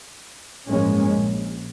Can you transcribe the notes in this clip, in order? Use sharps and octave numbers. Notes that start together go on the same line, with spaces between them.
A1 G2 F3 G#3 A#3 C#4
A#1